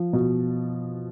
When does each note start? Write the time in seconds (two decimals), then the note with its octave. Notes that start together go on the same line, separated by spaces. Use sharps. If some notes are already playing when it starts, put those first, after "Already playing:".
Already playing: F3
0.13 B2